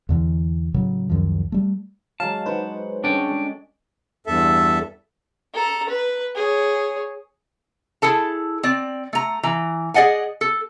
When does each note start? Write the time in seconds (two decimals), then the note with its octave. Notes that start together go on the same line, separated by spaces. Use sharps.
0.09 E2 D3 E3
0.74 A2 C#3 F#3
1.10 C#2 F#2 D#3 F3
1.52 G3 A3
2.20 F#3 G#3 F5 A5
2.46 D#4 B4 C5 F#5 D6
3.04 D3 G#3 C#4 D4 G5
3.28 G#3
4.27 E2 G2 A4 E5
5.54 A4 A#5
5.88 B4
6.35 G#4 C#5
8.02 E4 G#4 A4 A5
8.63 C4 D5
9.13 A3 A#5
9.43 E3 A#5
9.94 G#4 D5 D#5 F#5 G#5
10.41 A4